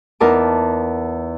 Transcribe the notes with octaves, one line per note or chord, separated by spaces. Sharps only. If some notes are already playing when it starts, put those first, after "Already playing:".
E2 D#4 A#4 A5 D6